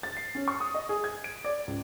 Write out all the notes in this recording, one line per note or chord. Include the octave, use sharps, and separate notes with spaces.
A6
C7
C#4
C#6
D#6
D#5
G#4
G#6
D7
D5
C#2